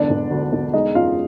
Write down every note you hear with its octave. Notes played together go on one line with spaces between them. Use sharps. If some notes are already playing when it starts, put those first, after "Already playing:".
Already playing: E1 D3 D4 D5
E1
D2
E1
G#3 D#4 D#5
F#2 F4 F5